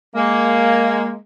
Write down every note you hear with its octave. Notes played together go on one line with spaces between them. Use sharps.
G#3 A#3